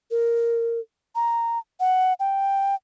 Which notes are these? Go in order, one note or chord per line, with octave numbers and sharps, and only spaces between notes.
A#4
A#5
F#5
G5